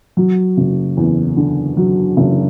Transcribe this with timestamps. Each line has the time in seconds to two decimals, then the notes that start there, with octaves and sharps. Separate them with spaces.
0.17 F#3
0.57 F#1
0.97 E2
1.37 D3
1.77 F#3
2.17 F#1